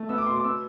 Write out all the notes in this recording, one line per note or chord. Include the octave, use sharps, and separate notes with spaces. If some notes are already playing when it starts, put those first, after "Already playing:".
Already playing: A3
B3 E6
D6
B2 C6
D6
B3 E6